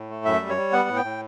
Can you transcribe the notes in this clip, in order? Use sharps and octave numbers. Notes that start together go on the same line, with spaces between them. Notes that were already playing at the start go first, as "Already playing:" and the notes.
Already playing: A2
A3
F#2 E5
G3
C#5
G3
B3 F#5
A2
G5
A2